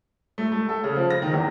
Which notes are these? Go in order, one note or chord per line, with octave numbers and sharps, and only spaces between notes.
A3
A3
A4
C#3
F3
A#6
D#3
E2